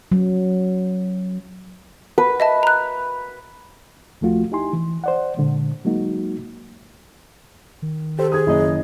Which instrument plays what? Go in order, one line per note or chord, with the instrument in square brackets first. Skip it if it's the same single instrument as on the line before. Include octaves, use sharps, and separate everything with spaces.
[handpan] F#3
[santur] B4
[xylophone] D#5 E5 A5
A#5 F#6
[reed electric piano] D#2 F3 A3 F4 F#4
D#4 E4 G4 G#5 C6
E3
C5 D5 F#5
A#2 D3 G#3
F#3 G#3 A#3 D#4 F#4
[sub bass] D#3
[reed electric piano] G4 C5 [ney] A4
[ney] G#4 [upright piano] D#6 G#6
[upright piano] F#1 [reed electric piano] E4 D#5